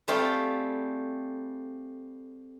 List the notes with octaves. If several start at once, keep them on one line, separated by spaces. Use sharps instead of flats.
G3 A3 C4 F4 G4 G#4